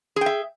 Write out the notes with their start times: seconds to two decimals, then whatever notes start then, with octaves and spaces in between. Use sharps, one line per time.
0.16 G#4
0.21 G5
0.26 E5